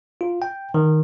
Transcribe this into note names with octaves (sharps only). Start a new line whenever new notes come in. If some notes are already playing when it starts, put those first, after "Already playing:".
F4
G5
D#3